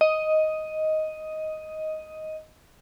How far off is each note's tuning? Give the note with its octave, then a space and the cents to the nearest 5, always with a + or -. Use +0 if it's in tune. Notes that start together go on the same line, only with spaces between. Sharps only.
D#5 +5